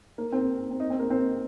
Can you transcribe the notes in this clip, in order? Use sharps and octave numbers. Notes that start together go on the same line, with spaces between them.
A#3
C4
C4
D#4
C4
A#3
C4